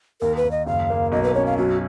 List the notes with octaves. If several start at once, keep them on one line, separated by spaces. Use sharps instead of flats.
D#2 A#4
B4
D#2
D#5
F#1 F5
A#3
B1 D#5
B4
C#4 C#5
F5
F#2 F#4